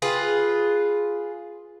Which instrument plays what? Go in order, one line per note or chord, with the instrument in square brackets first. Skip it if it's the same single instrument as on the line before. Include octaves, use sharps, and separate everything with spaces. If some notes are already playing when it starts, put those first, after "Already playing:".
[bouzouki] F4 G#4 B4